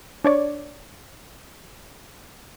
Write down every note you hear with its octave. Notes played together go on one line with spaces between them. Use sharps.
D4 C#5 D5